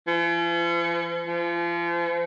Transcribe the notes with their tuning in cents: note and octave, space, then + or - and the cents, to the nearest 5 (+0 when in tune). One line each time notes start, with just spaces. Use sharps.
F3 -45
F3 -35